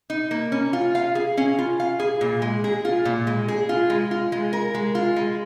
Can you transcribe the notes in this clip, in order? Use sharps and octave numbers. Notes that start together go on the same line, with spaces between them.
D#4
A#3
C#4
F4
F5
G#4
C#4
F4
F5
G#4
A#2
G#3
G#4
F4
A#2
G#3
G#4
F4
G#3
F4
G#3
A#4
G#3
F4
G#3